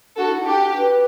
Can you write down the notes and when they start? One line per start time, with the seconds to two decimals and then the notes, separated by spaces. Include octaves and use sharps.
0.16 D4 F#4 A4
0.28 E4
0.41 D4
0.47 G4
0.76 B4